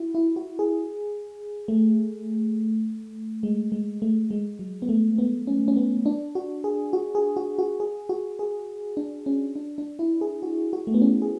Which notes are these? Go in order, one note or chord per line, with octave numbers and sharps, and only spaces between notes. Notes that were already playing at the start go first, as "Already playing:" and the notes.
Already playing: E4 F#4
E4
F#4
G#4
A3
G#3
G#3
A3
G#3
F#3
B3
A3
B3
C#4
C#4
B3
D4
F#4
G#4
F#4
G#4
F#4
F#4
G#4
F#4
G#4
D4
C#4
D4
D4
E4
G#4
F#4
F#4
A3
B3
C#4
G#4